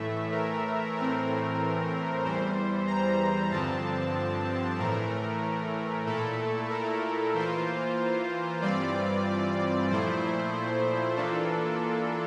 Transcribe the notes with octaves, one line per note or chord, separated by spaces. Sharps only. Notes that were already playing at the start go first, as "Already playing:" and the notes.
Already playing: A2 E3 A3 E5
A#4
A2 E3 A3 C4 A#4
E2 E3 G3 C5
A#5
G2 D3 F3 C4 A5
A2 E3 A3 A#4
A#2 A3 E4 A4
A#4
E3 A#3 F4 C5
G2 E3 G3 C4 F4 D5
A#2 F3 A3 E4 C5
E3 A#3 D4 F4 A4